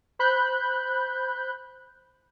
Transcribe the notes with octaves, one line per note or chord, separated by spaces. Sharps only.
C5 B5 F#6 G6